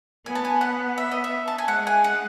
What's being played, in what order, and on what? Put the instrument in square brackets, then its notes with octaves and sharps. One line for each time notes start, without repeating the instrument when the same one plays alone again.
[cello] B3 [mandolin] G#5
[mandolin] A5
G#5
F#5
E5
D#5
E5
A5
G#5
[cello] G#3 [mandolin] F#5
[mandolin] G#5
F#5